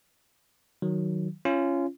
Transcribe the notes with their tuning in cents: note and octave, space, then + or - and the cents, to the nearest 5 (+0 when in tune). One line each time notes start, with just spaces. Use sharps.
D#3 +0 F#3 +0
C#4 +0 F4 -30